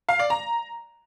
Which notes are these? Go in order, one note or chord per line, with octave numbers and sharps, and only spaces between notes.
F5
D5
A#5